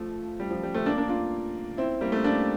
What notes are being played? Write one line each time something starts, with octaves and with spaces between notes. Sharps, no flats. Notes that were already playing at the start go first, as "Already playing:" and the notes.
Already playing: F3 A3
G3
F3
G3
A3 C4
A#3 D4
A#3 D4
D4 F4
C4 E4
G3 A#3
A3 C4
A#3 D4